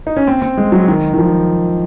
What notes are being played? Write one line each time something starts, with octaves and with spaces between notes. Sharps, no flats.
D#4
C#4
C4
C4
G#3
F#3
D#3
D#3
F3